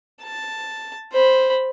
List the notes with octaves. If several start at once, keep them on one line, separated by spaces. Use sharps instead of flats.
A5
C5 B5